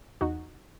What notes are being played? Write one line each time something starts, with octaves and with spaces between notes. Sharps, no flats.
E2 D#4 F#4